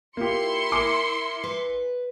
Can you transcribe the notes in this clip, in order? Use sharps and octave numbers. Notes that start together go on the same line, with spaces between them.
A#3 E4 F4 G4 C6 C#7
A#4 G#5 D6
B4